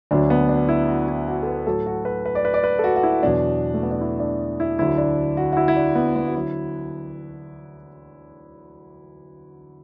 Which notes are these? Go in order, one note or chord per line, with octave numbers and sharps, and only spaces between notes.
D2 D3 F#3 D4
B3
D4
E4
F#4
E4
F#4
A4
B4
A2 F#3 A4
F#4
B4
B4
D5
B4
D5
B4
A4
F#4
F#4
E4
E2 B2 F#3 D4
A3
B3
D4
E4
D4
E4
D2 D3 F#3 E4
D4
F#4
F#4
E4
E4
D4
B3
B3
F#4
D3 F#3 E4